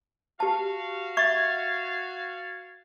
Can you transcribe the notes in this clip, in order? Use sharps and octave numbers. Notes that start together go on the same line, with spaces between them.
F#4 G4 F5 A5
E5 C#6 G#6 A6